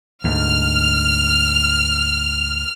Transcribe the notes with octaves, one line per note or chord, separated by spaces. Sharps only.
D2 G#2 F6